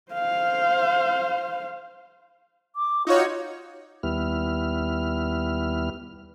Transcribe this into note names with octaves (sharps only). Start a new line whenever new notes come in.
C5 F5
D6
D#4 F4 F#4 C#5
D#2 G3 B3 E4 F6